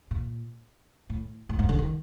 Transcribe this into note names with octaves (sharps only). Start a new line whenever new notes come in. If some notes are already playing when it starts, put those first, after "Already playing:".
A#2
A2
A2
G#2
D3
D#3